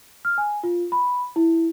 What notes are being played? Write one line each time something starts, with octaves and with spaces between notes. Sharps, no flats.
F6
G#5
F4
B5
E4